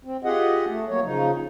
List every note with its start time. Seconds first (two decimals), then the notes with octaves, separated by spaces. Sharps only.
0.05 C4
0.24 F4 G4 G#4 D#5 F#5
0.68 A3
0.89 F#3 A#3 C#5
1.03 C#3 F3 D#4